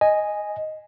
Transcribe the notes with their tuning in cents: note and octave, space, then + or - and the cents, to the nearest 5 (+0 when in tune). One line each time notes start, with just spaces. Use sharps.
D#5 +0 G#5 +0